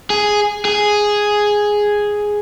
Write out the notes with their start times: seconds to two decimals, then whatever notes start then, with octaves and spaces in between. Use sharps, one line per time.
0.10 G#4
0.65 G#4